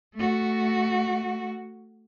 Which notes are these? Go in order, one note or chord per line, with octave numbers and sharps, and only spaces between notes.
A3 F#4